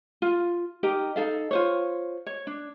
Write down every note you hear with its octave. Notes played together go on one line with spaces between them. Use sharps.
F4
D#4 G4 A#4 D#5
D#4 A4 F5
F4 C5 C#5
C#5
D4